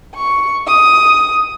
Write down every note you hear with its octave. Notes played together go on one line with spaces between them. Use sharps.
C#6
D#6